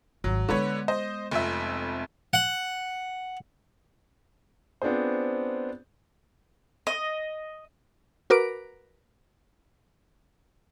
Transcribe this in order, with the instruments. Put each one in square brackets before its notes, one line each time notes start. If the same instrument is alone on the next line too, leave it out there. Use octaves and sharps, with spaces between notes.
[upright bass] G#1 [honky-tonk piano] F#3
[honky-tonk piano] D3 B4 C#5 [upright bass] G#3 B3
[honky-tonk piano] C5 D#5
F1 F2 E5
[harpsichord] F#5
[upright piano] B3 C4 D4 F4 G#4 C5
[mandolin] D#5
[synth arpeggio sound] F#4 A#4 B4 D6 D7